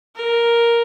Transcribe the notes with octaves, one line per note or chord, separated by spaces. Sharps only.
A#4